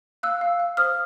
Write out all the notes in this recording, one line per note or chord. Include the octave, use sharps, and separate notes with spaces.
F5 E6 F#6
F5
F5
C5 D#6 F6